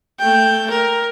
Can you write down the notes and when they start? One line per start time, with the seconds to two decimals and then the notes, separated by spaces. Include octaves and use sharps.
0.19 A3 G5
0.70 A#4